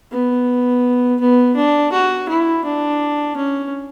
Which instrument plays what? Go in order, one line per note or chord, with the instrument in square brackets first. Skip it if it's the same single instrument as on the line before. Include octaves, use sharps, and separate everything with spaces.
[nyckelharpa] B3
B3
D4
F#4
E4
D4
C#4